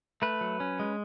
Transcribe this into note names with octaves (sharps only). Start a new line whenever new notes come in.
A3 B4
F#3
C#4
G#3